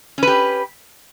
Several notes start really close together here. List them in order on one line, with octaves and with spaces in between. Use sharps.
C#4 B4 G4